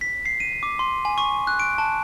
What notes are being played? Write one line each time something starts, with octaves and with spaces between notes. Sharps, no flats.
B6
C7
D#7
D6
C6
G#5
C#6
F#6
D7
A5